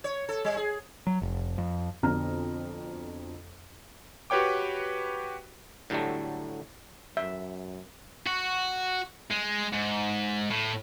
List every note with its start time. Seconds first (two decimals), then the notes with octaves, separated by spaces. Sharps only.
0.04 C#5
0.29 A4
0.44 G3
0.57 G#4
1.07 F#3
1.22 F1
1.58 F2
2.03 F2 B2 D3 A#5 F6
4.30 F#4 G4 B4 C#5 G5 D6
5.90 A2 D3 F#3 G3 A3
7.17 F#2 E5
8.26 F#4
9.31 G#3
9.73 G#2
10.50 A2